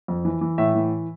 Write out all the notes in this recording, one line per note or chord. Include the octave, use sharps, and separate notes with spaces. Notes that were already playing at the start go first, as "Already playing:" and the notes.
F2
E3
E3
A2 E5
E3